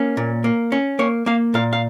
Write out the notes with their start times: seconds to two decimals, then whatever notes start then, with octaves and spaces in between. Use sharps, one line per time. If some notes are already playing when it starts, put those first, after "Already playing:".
Already playing: A#3 C#4
0.17 A#2
0.44 A#3
0.72 C#4
0.99 A#3 C#5
1.26 A#3 F5
1.54 A#2 F5
1.73 F5